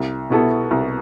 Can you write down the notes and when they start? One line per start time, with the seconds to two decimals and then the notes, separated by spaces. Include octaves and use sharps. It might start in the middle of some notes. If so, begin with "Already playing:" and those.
Already playing: C2
0.30 B2 B3 E4 A4
0.71 C2